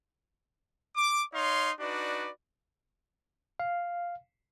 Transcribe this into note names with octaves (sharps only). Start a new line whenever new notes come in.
D6
D#4 C#5 F5 C6
D4 D#4 F#4 B4 D5
F5